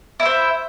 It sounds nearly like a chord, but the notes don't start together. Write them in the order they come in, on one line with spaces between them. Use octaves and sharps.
E4 E5 C5